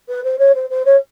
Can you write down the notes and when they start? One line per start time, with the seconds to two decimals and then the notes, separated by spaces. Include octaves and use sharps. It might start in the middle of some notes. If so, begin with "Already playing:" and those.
0.09 B4
0.24 C5
0.39 C#5
0.55 C5
0.70 C5
0.85 C#5